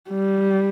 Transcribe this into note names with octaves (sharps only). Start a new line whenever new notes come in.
G3